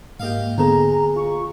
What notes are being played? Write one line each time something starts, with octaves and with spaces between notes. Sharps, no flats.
G#2 A#3 G4 D#5 F5
D3 G#3 B3 A4 A#5
F4 C#6